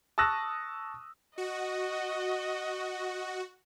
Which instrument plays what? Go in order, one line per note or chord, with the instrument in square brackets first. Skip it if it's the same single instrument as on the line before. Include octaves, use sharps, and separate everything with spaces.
[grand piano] A5 C#6 D#6 E6 F#6 A#6
[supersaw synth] F#4 [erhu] D#5